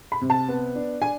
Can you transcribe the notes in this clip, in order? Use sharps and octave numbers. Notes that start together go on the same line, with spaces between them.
B5
C3
A5
B3
D4
D4 G#5